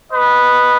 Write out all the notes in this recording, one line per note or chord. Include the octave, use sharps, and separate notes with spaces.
B4 D#5